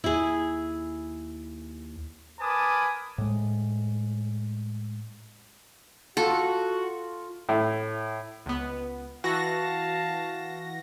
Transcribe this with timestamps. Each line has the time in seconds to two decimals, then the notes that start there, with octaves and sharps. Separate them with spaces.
0.04 D#2 E4 G#4
2.40 A#4 B4 G#5 A5 D6 D#6
3.18 A2 G#3
6.17 F4 F#4 A4
7.49 A2
8.46 C#2 B3
9.24 E3 F#4 F5 A5 A#6